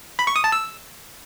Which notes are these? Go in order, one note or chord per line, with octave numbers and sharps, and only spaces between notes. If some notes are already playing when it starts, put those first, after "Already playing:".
B5
C#6
D#6
A5
E6